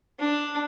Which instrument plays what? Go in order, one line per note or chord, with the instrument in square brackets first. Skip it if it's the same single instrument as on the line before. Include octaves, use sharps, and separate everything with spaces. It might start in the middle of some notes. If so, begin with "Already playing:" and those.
[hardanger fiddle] D4